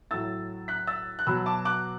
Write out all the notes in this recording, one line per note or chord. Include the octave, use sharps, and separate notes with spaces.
A2 F#3 E6 A6
F#6 B6
E6 A6
F#6
B2 F#3 B5 E6
A5 D6
D6 F#6